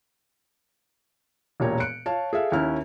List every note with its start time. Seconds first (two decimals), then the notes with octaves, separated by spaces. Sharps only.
1.60 E1 A#2 G4 C#5 A#5
1.80 F#6 C#7 D7
2.06 C#5 F5 A5
2.33 G#4 A4 E5 F5
2.52 D#2 C#4 E4 F6